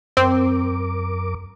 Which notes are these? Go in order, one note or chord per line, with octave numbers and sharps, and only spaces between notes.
F#2 C4 A#4 D6